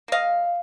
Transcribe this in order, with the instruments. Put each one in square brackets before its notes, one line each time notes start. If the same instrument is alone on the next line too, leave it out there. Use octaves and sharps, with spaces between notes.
[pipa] A#3 D#5 F5